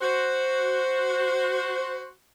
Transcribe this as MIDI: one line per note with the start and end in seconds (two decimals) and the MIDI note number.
0.01 2.10 66
0.01 2.10 72